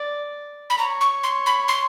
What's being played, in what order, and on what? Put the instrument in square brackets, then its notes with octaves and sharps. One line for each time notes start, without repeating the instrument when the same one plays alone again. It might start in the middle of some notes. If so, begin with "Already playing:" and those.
Already playing: [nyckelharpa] D5
[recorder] B5
[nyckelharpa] C#5 [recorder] A#5
[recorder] C#6
C6
B5
C6